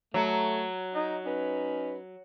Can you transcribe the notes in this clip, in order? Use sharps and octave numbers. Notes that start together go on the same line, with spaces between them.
F#3 A3
D#4
C#4 D#4 B4